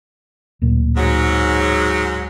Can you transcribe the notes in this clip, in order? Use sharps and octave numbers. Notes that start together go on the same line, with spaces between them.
D1 A#2
G#2 F#3